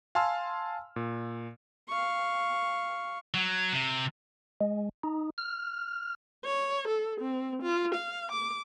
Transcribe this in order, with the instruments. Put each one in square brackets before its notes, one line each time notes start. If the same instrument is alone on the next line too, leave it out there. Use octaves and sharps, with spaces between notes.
[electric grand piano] F5 G#5 A5 C6 E6 F6
A#2
[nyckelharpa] F5 C#6
[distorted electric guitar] F#3
C3
[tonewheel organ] G#3
D#4
F6
[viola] C#5
A4
C4
F4
F5
D6